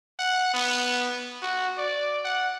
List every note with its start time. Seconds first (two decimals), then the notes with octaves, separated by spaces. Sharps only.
0.19 F#5
0.54 B3
1.42 F#4
1.77 D5
2.25 F#5